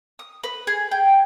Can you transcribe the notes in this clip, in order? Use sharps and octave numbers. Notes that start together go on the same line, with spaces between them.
D#6
B4
G#4
G5